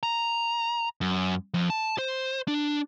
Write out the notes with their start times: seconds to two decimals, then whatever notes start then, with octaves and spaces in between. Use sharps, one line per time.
0.03 A#5
1.01 F#2
1.54 F2
1.70 A5
1.98 C5
2.48 D4